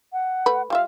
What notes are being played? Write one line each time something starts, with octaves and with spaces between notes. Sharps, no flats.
F#5
A3 B4
G3 F4 E5 F5